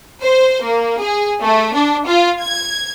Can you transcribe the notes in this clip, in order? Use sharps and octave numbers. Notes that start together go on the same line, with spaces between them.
C5
A#3
G#4
A3
D4
F4
G#6